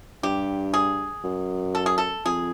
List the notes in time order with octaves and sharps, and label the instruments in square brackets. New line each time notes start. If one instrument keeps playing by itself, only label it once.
[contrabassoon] G2 [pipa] G4
[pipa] G#4
[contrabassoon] F#2
[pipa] A4
G#4
A4
[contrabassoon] F2 [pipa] G#4